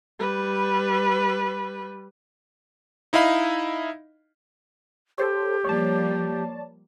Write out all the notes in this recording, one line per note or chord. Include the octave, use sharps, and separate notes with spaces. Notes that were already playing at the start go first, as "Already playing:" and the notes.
G3 B4
D#4 E4 D#5 F5 B5
G4 A4 C5 C#5
F3 G3 A#3 C#5 D5 A5